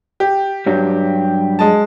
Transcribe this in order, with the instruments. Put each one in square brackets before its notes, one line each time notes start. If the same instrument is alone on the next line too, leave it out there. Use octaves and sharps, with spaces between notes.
[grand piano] G4
[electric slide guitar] G2 F#3 G3
[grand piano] G#3 A5